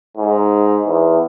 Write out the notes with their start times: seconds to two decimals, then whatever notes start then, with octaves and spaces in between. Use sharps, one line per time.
0.17 G#2
0.87 E2